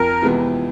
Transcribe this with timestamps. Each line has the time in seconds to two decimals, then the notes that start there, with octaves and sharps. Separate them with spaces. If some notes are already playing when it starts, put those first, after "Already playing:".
Already playing: F2 A#4
0.21 C3 E3 G#3 B3